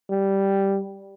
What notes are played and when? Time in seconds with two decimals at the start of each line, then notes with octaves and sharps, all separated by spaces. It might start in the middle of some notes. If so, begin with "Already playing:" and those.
0.10 G3